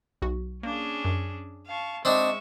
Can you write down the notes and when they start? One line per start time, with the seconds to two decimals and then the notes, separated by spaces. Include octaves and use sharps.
0.22 B1 F#4
0.63 A#3 C#4 D4 G#4
1.05 F#2
1.67 F5 A5 C#6
2.05 G#3 C4 D4 D#4 E5 C#6